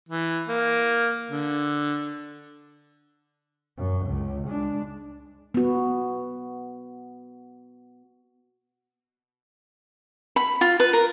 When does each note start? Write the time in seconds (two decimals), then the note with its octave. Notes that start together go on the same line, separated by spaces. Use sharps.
0.09 E3
0.49 A#3
1.30 D3
3.77 F#2
4.06 C#2
4.47 G#3 D4
5.54 B3 F#4
10.36 B5
10.61 F4
10.80 B4
10.93 A#4